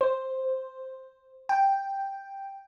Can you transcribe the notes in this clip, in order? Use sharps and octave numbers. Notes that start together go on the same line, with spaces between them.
C5
G5